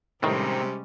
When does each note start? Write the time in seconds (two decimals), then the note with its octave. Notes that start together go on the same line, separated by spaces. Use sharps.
0.23 A2 C3 D#3 G3 G#3 C4 C#4 D#4